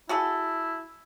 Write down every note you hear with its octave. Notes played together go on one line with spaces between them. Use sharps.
E4 F#4 G#4 A4